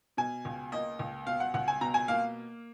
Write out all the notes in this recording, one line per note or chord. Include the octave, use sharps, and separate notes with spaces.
B2 G#5
C#2
A#3 D#5
C#2
B2 F5
F#5
C#2 F#5
G#5
B2 A#5
G#5
A#3 F5